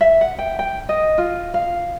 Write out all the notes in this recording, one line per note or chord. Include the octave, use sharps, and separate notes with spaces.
E5
F#5
G5
G5
D#5
F4
F5